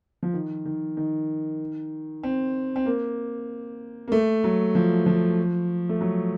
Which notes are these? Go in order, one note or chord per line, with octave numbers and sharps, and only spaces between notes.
F3
D#3
D#3
D#3
C4
C4
A#3
A#3
A3
F#3
F3
F3
A3
F#3